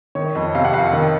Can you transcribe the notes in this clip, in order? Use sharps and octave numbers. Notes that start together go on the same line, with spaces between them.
D#3 C#5
F2 D#5
C3 F5
F#5
F2 F5
D#3